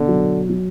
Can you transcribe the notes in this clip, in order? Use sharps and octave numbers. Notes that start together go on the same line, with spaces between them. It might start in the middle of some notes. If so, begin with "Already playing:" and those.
Already playing: B2 D3
F#3
F#3